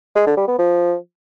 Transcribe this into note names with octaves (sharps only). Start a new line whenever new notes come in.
G#3
D3
G3
B3
F3